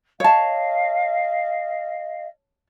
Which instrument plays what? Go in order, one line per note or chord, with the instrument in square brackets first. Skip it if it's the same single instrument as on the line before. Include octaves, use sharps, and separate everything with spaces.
[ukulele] C#5 A5 [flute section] D#5 F5